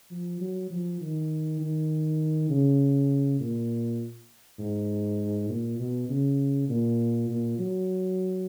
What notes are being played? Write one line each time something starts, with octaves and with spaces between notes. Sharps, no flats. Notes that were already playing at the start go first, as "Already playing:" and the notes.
F3
F#3
F3
D#3
D#3
C#3
A#2
G#2
A#2
B2
C#3
A#2
A#2
F#3